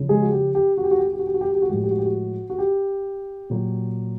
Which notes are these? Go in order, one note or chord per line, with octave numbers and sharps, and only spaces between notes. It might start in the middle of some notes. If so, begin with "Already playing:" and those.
Already playing: C#3 F3
G#3 G#4
F#4
G4
G4
F#4
G4
F#4
G4
F#4
G4
F#4
G4
F#4
G4
F#4
G4
F#4
A2 F3 G#3 G4
F#4
G4
F#4
G4
F#4
F#4
G4
A#2 F#3